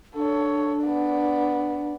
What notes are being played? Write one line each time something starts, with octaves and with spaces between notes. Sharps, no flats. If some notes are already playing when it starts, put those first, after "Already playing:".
D4 A4 C#5
B3 D5